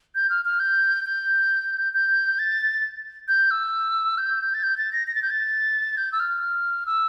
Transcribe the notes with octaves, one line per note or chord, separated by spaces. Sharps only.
G6
F6
F6
G6
G6
G6
A6
G6
E6
G6
A6
G6
A6
A#6
A#6
A6
G6
A6
G6
E6
F6
E6